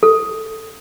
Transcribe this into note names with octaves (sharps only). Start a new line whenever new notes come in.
A4